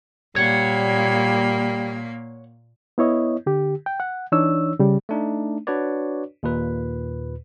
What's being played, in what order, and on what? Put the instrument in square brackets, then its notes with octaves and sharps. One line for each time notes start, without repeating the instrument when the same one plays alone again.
[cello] A#2 A#3 [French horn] G3 [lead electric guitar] C#5 F#5
[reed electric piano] B3 E4 C#5 D#5
D3 G4
G5
F#5
E3 D4 D#4 C#5 E6
C#3 G3
[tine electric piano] A3 D4 D#4
D4 F#4 B4 C#5 D5
D#2 A#2 B4